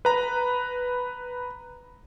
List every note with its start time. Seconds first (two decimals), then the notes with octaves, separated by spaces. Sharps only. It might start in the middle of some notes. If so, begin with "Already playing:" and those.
0.05 B4 A#5